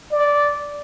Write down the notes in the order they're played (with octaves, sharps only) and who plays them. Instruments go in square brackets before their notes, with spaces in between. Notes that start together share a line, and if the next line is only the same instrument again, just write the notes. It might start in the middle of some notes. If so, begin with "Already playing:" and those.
[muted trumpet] D5